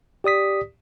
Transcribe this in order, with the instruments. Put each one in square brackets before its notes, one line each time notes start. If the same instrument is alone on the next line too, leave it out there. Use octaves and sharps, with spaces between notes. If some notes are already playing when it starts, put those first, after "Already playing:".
[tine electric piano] G4 D5 D#6 B6